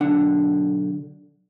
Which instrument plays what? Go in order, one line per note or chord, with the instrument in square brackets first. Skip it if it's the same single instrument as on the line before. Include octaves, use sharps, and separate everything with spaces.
[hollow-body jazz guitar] B1 D3 D4 F#5